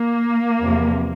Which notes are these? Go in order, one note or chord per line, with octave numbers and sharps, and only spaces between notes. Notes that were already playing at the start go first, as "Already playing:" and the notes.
Already playing: A#3
E2 C3 F3